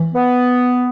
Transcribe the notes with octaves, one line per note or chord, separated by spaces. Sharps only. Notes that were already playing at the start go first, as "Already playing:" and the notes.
Already playing: E3
B3